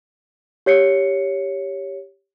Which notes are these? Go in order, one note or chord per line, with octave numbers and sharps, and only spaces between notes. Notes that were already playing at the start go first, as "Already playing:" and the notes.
G4 C#5 C7 C#7